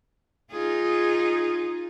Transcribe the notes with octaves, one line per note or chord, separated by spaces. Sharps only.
D#4 F4 G#4